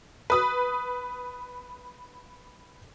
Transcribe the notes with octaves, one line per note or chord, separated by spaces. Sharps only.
B4 D#6